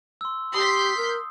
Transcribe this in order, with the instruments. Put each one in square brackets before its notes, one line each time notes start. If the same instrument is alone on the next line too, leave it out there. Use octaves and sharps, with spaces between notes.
[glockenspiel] C6 E6
[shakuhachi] G4 [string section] C6 G6 B6 [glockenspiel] D#6
[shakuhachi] A#4